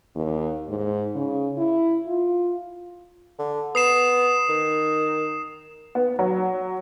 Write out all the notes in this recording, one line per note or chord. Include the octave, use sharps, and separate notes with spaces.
D#2
G#2
C#3
E4
F4
D3
B3 D#6 C7 E7
D#3
B3
F#3